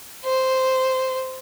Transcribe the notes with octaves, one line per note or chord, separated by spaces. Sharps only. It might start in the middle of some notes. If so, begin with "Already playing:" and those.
C5